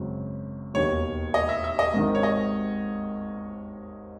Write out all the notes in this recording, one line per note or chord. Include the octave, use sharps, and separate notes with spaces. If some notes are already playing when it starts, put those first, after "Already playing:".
Already playing: G#1 F#2 C#3 F#3
E1 D#2 D#3 C#5
D#5
E5
E5
D#5
G#1 G#2 D#3
C#5
D#5